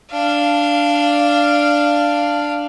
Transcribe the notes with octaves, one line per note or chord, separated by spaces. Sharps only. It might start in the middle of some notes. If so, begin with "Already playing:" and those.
D4 F5